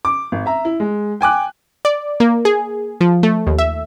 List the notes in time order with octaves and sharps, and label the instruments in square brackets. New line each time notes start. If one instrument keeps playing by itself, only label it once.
[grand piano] D6
G#1
E5 A#5
E4
G#3
G5 G#5 D6 F#6
[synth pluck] D5
A#3
G#4
F3
A3
D#2
E5